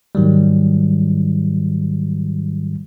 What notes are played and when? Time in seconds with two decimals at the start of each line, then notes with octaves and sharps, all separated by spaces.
0.15 G#2 D#3 F#3 G3